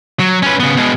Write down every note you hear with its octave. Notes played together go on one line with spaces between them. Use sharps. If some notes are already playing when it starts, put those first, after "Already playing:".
F#3
C#4 B4
C#3 B3
B2 G#3